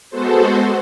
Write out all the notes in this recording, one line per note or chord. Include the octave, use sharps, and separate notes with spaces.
G#3 B3 F#4 A4 C5